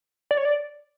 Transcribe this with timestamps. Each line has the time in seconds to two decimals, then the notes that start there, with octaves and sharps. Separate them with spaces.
0.31 D5
0.37 C#5
0.45 D5